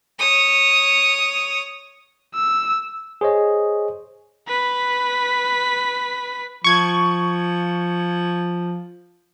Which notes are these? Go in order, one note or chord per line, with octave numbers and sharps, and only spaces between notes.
C#5 D#6
E6
G#4 C5 C#5 D#5
B4 B6
F3 C#6 G#6